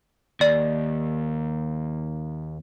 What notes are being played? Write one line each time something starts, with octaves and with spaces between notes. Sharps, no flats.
D#2 D5